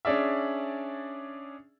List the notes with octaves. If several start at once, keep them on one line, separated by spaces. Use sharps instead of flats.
C#4 D4 G#4 D5 E5